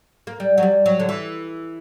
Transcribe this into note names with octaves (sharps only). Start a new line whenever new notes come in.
A#3
G3
F#3
G3
F#3
D3
E3